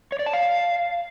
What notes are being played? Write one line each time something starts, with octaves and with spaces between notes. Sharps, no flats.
C#5
D5
A5
F5